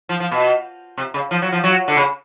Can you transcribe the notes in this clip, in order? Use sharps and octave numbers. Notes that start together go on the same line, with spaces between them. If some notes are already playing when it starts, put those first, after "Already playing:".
F3
F3
B2
C3
C#3
F3
F#3
F3
F#3
D3
C#3